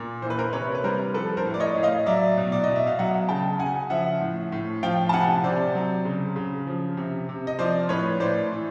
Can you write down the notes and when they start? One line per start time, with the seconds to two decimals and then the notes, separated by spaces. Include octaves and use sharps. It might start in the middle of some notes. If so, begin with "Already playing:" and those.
Already playing: A#2
0.22 E3 C5
0.30 B4
0.39 A#4 C5
0.53 C3 B4 C#5
0.75 B4
0.84 G3 A#4 C5
1.14 F3 A4 B4
1.37 A#4 C5
1.44 A2
1.54 D5
1.60 C#5 D#5
1.76 A2
1.83 D#5 F5
2.06 F#3 D5 E5
2.37 B2
2.52 D5
2.64 B2 D#5
2.76 E5
2.87 F5
2.99 F#3 E5 F#5
3.29 C#3 G5 A5
3.59 C#3 F#5 G#5
3.90 F3 E5 F#5
4.21 A2
4.52 A2
4.83 F3 F5 G5
5.09 A5
5.13 C3 F#5 G#5
5.44 C3 C5 D5
5.75 F#3
6.05 C#3
6.36 C#3
6.67 F3
6.97 C3
7.29 C3
7.47 D#5
7.59 F3 C5 D5
7.89 A2 B4 C#5
8.20 A2 C5 D5
8.52 E3